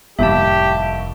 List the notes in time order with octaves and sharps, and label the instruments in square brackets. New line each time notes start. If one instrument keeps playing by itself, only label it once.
[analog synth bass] F1 [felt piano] D#2 A2 G3 [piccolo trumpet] G4 [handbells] E5 A5